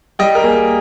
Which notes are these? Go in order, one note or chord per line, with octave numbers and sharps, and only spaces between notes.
G3 D#5 G5
A#4
A#3 G#4